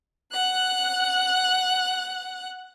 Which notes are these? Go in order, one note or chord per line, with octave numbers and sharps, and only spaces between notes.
F#5 F#6